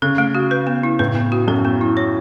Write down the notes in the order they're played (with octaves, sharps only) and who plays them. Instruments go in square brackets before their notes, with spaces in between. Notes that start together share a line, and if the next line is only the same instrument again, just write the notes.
[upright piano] C#3 [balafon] A4
[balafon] A3
F#4
B4
B3
E4
[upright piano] A2 [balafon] B4
[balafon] B3
F#4
[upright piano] F#2 [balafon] A4
[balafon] B3
E4
C#5